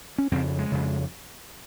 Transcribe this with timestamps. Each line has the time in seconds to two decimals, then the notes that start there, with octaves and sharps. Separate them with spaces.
0.18 C#4
0.32 F2 C#3 C4
0.59 G#3
0.72 F2 C#3